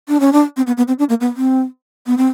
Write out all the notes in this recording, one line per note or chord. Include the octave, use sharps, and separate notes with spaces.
D4
C#4
D4
C4
B3
B3
C4
D4
A#3
B3
C4
B3
C4